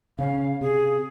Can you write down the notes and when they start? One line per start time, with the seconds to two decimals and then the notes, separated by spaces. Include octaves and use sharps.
0.19 C#3 C#4 F5
0.61 C3 G#4